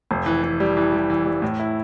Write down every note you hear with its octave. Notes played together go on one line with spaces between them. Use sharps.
F1
E3
E3
G3
E3
G3
E3
G3
A2
E4